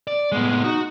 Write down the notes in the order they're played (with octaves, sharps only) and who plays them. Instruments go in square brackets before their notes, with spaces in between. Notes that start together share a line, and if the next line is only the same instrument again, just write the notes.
[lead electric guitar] D5
[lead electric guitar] A2 G#3 [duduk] B3
[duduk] D#4 [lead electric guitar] F#4